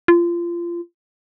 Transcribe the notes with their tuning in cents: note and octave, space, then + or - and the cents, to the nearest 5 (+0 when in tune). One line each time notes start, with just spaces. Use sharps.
F4 -25